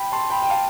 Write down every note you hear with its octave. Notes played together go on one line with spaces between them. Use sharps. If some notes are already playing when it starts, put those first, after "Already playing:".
Already playing: G5 B5
A5 C6
G5 B5
G5
F5 A5